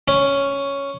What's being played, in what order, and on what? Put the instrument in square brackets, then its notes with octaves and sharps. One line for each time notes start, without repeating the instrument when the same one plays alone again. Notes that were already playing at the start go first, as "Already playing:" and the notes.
[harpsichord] C#4